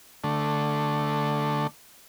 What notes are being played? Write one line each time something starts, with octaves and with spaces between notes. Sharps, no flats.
D3 A3